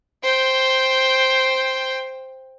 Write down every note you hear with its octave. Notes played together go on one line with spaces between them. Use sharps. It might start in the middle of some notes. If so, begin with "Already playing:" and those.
C5 G5